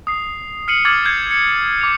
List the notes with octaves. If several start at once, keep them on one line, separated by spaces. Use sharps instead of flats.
D#6 C7
F6 C7 C#7 D#7 F#7
D6 F6 G#6 A6 F#7
G6 G#6 C7 C#7
C#7
D6 F7